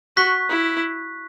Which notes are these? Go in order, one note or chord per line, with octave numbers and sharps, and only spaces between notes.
F#4 C#6 F#6 B6
E4